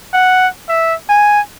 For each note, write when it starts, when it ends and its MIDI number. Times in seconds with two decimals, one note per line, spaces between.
0.13 0.47 78
0.68 0.94 76
1.09 1.40 80